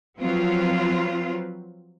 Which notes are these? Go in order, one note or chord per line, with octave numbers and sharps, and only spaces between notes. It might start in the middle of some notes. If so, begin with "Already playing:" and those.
F3 F#3 C4 F4 B4